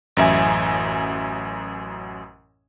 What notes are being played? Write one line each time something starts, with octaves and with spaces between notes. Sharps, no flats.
A1 F#2 E5 G#5